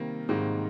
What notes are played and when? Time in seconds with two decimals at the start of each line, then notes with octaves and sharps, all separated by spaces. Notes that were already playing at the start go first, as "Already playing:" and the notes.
Already playing: C3 D#3 G3 A#3
0.29 G#2 C3 D#3 G3 A#3